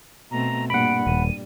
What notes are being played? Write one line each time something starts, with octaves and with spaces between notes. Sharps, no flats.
B2 A3 C4 A#5
G2 A#2 A#3 F#5 B5 D7
D#1 G3 D#7